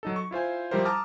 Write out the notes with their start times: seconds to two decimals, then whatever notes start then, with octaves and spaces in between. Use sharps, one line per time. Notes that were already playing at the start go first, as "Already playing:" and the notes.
0.03 F#3 D#4 A4
0.16 C#6
0.31 E4 F4 C5 G#5
0.71 F3 G3 E4 G4 A#4 C5
0.85 A5 A#5 D6 D#6 F6